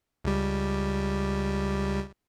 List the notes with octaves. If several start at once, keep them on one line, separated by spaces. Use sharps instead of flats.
C#2 G3